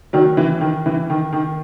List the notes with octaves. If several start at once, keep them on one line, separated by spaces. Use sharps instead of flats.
D#3 F#3
E3
D#3
E3
D#3
D#3